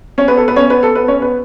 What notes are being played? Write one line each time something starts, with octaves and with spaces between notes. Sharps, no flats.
C#4 C#5
B3 B4
A4
B3 B4
C#4 C#5
B3 B4
A4
B3 B4
C#4 C#5
B3 B4